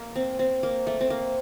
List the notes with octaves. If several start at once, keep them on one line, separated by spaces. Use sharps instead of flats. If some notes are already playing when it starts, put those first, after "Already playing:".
Already playing: A#3
C4
C4
A#3
A3
C4
A#3